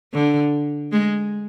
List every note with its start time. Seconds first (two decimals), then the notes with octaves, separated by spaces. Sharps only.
0.14 D3
0.92 G#3